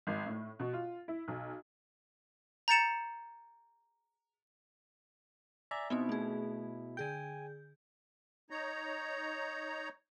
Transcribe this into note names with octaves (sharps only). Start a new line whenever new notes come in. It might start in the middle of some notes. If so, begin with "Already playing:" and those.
G#1
A2
B2
F4
E4
B1
A#5 G6 A6 C#7 E7
D5 E5 G#5 A#5
B2 B3 C4 D#4 E4
A3 G#4
D3 G#4 G5 G#5 G6
D#4 C#5 A#5